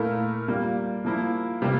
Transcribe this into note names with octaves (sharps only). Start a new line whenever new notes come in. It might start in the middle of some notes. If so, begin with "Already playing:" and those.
Already playing: A#2 A3 E4 A#4
G3 A#3 F4
F3 A#3 E4
C3 G3 A#3